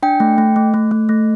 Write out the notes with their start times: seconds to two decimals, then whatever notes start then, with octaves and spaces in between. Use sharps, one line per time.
0.03 D4 G5
0.20 A3
0.38 A3
0.56 A3
0.74 A3
0.91 A3
1.09 A3